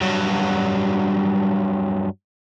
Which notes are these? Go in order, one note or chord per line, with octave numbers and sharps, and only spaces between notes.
G2 F#3